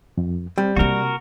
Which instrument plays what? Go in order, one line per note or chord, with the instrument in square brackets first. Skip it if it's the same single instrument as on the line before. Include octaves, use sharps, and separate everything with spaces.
[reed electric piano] F2
[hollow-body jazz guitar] G3 [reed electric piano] C4
[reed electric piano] C3 [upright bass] A#3 E4 [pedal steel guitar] F#4 A#4